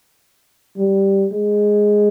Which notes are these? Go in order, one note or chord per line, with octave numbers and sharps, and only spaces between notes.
G3
G#3